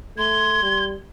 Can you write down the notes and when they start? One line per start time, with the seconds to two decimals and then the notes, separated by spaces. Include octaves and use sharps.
0.18 A3 C6 G#6
0.63 G3